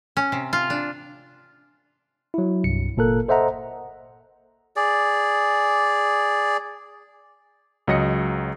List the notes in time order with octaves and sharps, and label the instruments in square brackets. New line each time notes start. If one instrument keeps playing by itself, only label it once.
[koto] C#4
C3
F4
D4
[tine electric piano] F#3 E4
C2 G2 C3 C#7
G1 A#2 A#3 A4 A#4 F#6
A4 C5 D#5 E5 F#5 A#5
[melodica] G#4 D5
[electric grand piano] C#2 F#3 D#5 A#6 C#7